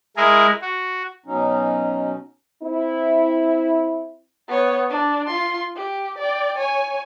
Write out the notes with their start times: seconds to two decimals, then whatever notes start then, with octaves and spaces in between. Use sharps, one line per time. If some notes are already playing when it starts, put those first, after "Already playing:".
0.17 G#3 E4 G#4 A#4
0.61 F#4
1.26 B2 F#3 C#4 D#4
2.63 C4 E4
4.48 B3 C#5
4.90 D4
5.27 F4 C6
5.76 G4
6.18 D5 G5
6.58 C#5 G#5